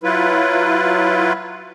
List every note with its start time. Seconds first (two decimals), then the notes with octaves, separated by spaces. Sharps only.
0.04 F#3 E4 F4 B4